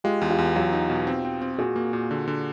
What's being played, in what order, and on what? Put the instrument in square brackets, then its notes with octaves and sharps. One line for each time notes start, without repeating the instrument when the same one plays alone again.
[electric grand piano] G#3 [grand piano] F4 G4
[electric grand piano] E2
[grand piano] F4 G4
[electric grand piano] E2
[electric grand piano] F#3 [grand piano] F4 G4
[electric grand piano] D#4
B2
C4
C4
C4
[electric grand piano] A#2 [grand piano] F#4 G#4
[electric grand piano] A#3
A#2
D3
D3